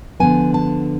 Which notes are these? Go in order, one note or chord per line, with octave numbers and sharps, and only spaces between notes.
D3 F3 B3 G#5
A5